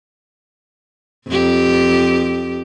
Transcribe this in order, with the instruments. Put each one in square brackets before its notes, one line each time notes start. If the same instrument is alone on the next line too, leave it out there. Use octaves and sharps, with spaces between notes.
[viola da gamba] F2 G4